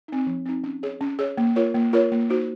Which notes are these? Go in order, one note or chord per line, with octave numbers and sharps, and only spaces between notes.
C4 D#4
F3
C4 D#4
C#4
G#4 C#5
C#4
G#4 C#5
A#3
F4 A#4 C#5
A#3
F4 A#4 C#5
A#3
D#4 F#4 C5